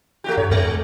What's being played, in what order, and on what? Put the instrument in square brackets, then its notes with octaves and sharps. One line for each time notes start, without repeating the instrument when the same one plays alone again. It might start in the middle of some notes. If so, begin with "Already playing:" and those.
[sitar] A3 F#4 G4
[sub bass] G2 [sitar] C#5
[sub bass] F2 [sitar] G#3